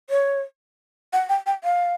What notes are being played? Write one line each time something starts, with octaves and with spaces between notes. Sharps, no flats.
C#5
F#5
G5
G5
F5